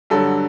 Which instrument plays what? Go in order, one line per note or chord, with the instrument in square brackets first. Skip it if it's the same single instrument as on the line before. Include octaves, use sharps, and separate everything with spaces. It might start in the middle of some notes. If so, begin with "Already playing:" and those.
[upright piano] G2 D3 F#3 A4